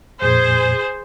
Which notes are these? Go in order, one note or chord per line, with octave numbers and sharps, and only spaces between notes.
F2 A#2 G#4 C5